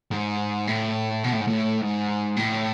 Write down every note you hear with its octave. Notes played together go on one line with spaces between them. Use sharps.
G#2
A2
B2
A2
G#2
A2
G#2
A2